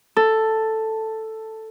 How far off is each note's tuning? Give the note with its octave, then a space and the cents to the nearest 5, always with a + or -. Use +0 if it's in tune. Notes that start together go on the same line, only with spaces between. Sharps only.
A4 +5